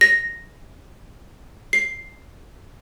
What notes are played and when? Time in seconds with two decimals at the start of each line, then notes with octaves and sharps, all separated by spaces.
0.01 A#6
1.73 C7